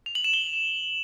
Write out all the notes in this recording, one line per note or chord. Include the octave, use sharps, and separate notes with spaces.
F7
F#7
E7
G7